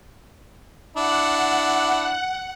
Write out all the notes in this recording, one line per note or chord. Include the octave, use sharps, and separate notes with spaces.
D4 E4 F#5